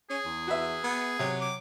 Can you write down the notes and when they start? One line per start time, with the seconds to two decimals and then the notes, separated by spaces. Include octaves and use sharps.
0.10 C#4 G#4
0.25 E2
0.47 F#4 B4 E5
0.84 B3
1.19 C3 F#3
1.41 D6